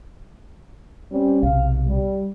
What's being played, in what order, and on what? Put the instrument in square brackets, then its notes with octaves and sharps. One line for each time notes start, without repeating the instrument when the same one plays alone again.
[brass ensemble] G3 C4 C#4
[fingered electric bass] B1 C3 [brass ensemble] F5
[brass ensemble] G3